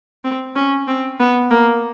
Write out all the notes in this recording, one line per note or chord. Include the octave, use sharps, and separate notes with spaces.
C4
C#4
C4
B3
A#3